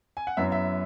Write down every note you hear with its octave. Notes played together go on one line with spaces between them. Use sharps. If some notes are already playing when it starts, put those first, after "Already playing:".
G#5
F#5
F#2 F#3 B3 E4 E5
E5